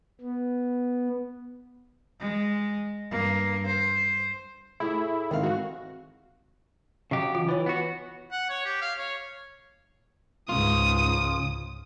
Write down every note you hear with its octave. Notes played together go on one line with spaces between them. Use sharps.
B3
G#3
G2 A#3
C5
A2 E4 G#4
G#2 D#3 C4 F5
F#4
C#3 F#3 G4 D#5
E3 F4
E3 B4 C#5
B3 F#4
F#5
C#5
G4
F5
C#5
C#2 G#2 C#3 F4 D#6